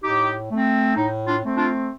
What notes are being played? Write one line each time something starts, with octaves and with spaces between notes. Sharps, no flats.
A2 D#4 G4
A3 C4
A2 D#4
D4 F4
A3 C4
D4 F4